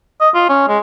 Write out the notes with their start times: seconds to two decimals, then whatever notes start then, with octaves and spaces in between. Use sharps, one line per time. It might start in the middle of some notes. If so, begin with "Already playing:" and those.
0.21 D#5
0.34 F4
0.49 C#4
0.68 G#3